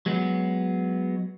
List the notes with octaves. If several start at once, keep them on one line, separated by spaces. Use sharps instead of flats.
F#3 G#3 B3